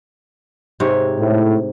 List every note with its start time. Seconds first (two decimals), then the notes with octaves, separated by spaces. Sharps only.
0.80 G#2 C3 C#5
1.19 A2